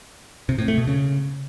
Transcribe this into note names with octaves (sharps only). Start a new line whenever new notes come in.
C3
A2
A3
B2
C#3